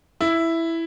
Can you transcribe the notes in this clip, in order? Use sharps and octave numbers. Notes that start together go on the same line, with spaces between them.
E4